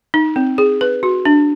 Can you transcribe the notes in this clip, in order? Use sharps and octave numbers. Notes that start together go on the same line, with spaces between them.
D#4
C4
G#4
B4
F#4
D4